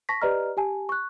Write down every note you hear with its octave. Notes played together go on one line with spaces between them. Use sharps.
A5 C#6 A#6 B6
G4 B4 D5 D#5 A#5 F6
G4 G#5 A5
C#6 F#6